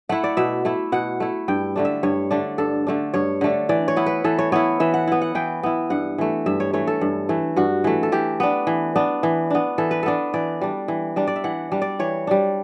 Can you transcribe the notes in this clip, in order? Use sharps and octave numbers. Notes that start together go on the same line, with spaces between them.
A3 E4 F#5
D5
B2 E5
A3 E4
B2 F#5
A3 E4
G2 G5
D3 A3 D4
E5
G2 C#5
D3 A3 D4
G2 A4
D3 A3 D4
G2 C#5
D3 A3 D4
E3 D5
C#5
B3 E4
B4
E3 A4
C#5
B3 E4 C#5
E3 E5
F#5
B3 E4
F#5
E3 G5
B3 E4
G2 F#5
E3 A3
G2 E5
C#5
E3 A3 C#5
A4
G2
E3 A3
G2 F#4
E3 A3
A4
E3 G4
B3 D4
E3
B3 D4
E3
B3 D4
E3 A4
B4
B3 D4 A4
E3 D5
G3 D4
E3
G3 D4
D5
E5
E3 F#5
G3 D4
D5
E3 C#5
G3 D4